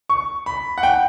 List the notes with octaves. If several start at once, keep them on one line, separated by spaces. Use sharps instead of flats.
C#6
B5
F#5
G5